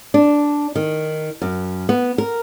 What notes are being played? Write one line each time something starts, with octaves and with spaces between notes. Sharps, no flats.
D4
D#3
F#2
B3
A#4